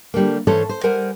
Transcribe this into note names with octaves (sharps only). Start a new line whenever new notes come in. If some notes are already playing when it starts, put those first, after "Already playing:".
D3 G3 A3 A#3
G#2 E3 C#4 A4 C5 C#5
C5
G3 A#4 C5 F#5 G#5